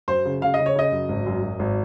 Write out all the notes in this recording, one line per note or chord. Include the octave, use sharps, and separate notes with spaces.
F#2 C5
C#3
C#3 F5
D#5
C#3
C#5
C#3 D#5
F#2
G#1
F#2
F#2
G#1